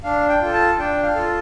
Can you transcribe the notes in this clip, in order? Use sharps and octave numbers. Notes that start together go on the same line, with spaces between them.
D4 F5
G5
F4 A4
A5
D4 G5
F5
F4 A4